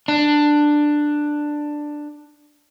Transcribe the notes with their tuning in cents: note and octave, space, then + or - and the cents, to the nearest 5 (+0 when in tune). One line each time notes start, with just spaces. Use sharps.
D4 +10